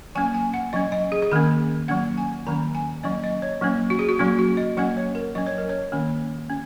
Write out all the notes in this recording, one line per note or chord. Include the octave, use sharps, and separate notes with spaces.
F#3 A#3 C#4 G#5
G#5
F#5
F#3 C#4 D#5
D#5
G#4
G#4
D#3 A#3 C#4 A#4
F#3 A#3 C#4 F#5
G#5
D#3 F#3 A#3 C#4 A#5
G#5
F#3 A#3 C#4 D#5
D#5
C#5
F#3 A#3 C#4
F#4
G#4
F#4
F#3 A#3 C#4 F#4
F#4
D#5
F#3 A#3 C#4 F#5
C#5
A#4
F#3 C#4 D#5
C#5
A#4
C#5
D#3 A#3 C#4
C#4